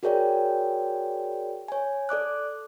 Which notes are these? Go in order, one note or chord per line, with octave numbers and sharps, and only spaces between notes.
F#4 G#4 A#4 C#5 D5 G5
C#5 G#5
A4 D5 D6 F#6